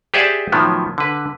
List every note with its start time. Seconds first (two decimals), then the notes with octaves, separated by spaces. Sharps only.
0.14 G4 G#4 C5 D5 E5 F#5
0.52 A2 D#3 F3 F#3 B3
0.98 D3 B4